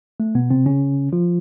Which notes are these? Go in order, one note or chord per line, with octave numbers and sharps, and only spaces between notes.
A3
B2 B3
C3 C4
C#3 C#4
F3 F4